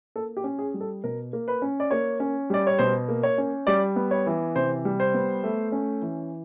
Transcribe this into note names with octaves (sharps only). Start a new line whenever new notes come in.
A#3 A4
G4
C#4
G#4
G3
A4
B2 A#4
A#3
B4
C#4
D5
A#3 C#5
C#4
G3 D5
C#5
B2 C5
A#3
C#5
C#4
G3 D5
B3
C#5
E3
C3 C5
G3
C5
B3
A3
C#4
E3